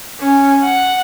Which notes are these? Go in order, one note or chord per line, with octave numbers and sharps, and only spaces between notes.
C#4
F#5